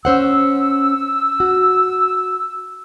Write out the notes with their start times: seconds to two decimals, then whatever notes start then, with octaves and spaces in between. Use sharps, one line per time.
0.05 C#4 C5 F#5 E6
1.40 F#4